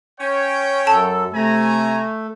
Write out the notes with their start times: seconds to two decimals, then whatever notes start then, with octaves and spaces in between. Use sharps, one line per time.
0.19 C#4 C#5 G5
0.87 F#2 A4 A5
1.33 C3 A3 G#5 A#5